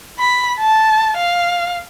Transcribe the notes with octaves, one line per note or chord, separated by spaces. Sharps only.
B5
A5
F5